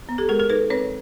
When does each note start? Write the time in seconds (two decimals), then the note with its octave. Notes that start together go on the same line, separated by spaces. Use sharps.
0.09 B3
0.18 G4 A4
0.29 G#3 G#4 A#4
0.39 G#4 A#4
0.50 D#4 A4 B4
0.70 C4 B4 C#5